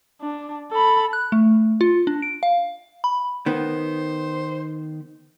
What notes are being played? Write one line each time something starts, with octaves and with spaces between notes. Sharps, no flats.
D4
A4 B5
F#6
A3
F4
D4
D7
F5
B5
D#3 B3 C5